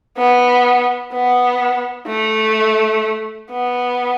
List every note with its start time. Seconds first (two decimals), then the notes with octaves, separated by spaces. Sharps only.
0.18 B3
1.13 B3
2.07 A3
3.51 B3